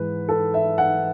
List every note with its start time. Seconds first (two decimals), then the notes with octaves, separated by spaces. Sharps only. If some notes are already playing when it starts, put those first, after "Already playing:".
Already playing: G#2 E3 G#3 B4
0.28 A4
0.54 E5
0.78 F#5